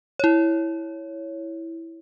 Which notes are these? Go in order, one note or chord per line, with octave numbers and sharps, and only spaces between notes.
E4 C#5